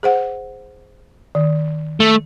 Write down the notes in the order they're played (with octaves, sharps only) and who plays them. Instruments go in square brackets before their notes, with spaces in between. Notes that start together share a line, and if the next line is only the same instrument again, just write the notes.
[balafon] G#4 C5 F#5
D#3
[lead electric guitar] A3